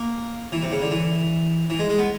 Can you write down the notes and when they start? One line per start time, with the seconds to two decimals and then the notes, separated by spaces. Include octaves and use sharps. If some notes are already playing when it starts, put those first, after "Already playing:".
Already playing: A#3
0.52 E3
0.63 C3
0.72 C#3
0.82 D3
0.91 E3
1.70 E3
1.79 G#3
1.89 G#3
1.98 B3